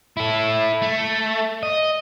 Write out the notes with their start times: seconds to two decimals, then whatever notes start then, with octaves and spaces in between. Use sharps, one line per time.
0.17 E4 A4
0.82 A3
1.63 D#5